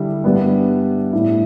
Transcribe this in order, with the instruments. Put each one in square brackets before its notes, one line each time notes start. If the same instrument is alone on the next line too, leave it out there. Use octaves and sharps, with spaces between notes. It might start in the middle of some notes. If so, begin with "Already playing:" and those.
Already playing: [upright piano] D3 G3 D4 E4
G2 G3 B3 D4
A2 G3 D4 E4